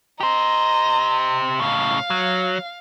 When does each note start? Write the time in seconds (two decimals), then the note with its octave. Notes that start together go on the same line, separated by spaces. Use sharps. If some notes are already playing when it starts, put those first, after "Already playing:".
0.20 G4 C5 D#5 A#5
1.60 A2 C#3 F5
2.10 F#3